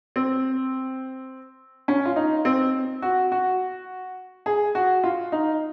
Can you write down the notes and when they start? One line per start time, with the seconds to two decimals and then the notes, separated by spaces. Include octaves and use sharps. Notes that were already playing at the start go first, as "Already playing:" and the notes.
0.16 C4
1.88 C#4
2.05 F4
2.16 D#4
2.45 C4
3.02 F#4
3.32 F#4
4.46 G#4
4.75 F#4
5.04 F4
5.32 D#4